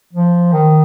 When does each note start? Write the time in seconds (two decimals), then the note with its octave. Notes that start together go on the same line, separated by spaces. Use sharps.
0.13 F3
0.53 D#3